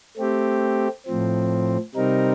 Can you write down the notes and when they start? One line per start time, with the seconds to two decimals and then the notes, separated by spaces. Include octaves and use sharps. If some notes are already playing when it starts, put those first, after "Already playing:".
0.17 A3 C4 G4
1.06 A2 F3 C4
1.95 C3 G3 C4 D#4 A#4